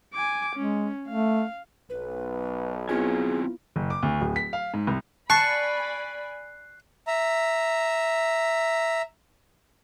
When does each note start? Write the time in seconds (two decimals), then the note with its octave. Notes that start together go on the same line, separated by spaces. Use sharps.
0.14 G#5 D6
0.56 G#3 C#4
1.08 A3 F5
1.90 B1 B4
2.89 F#3 B3 C4 E4 F4 G#4 G#5
3.76 F#1
3.90 D6
4.03 D2
4.21 D1
4.36 B6
4.53 F5
4.74 G#2
4.87 C2
5.30 D5 G#5 A5 B5 C#6 F#6 C7
7.07 E5 A#5